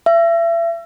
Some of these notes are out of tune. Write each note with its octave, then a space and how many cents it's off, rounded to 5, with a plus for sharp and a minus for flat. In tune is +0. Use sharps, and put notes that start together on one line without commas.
E5 +35